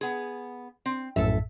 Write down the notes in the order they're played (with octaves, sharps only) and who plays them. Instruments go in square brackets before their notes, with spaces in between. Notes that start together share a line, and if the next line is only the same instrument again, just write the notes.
[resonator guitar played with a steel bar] B3 G#4
C4
[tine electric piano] A#1 F#2 A2 [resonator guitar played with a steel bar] A4 E5